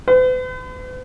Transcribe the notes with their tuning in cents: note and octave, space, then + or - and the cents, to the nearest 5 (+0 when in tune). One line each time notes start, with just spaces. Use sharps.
B4 +45